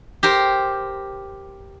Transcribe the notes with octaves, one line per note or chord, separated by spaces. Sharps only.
G4 A#4 C5